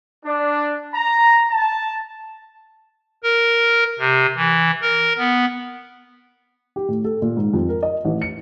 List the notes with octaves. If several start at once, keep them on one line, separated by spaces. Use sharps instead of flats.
D4
A#5
A5
A#4
C3
E3
A#4
B3
G4
A2
A4
A#2
G#2
F2
A#4
D#5
A1
C#7